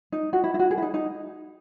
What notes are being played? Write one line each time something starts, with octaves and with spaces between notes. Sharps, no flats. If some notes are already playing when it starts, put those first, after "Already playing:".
D#4
F#4
E4
E4
F#4
G#4
E4
D#4
D#4